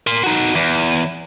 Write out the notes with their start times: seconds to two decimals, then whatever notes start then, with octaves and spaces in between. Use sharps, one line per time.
0.07 A#4 C6
0.23 D#4 F#4
0.55 E2